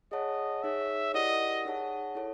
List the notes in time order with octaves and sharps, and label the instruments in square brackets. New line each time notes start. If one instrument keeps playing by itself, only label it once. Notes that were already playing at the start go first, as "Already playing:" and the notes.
[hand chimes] G#4 C#5 F#5 A5 [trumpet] D#5
[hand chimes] D#4 G#4 C#5 [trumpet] E5
[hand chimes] E4 G4 A#4 D5 F#5 [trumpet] D#5
[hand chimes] D#4 G#4 C#5 F#5 A5
E4 A4 C#5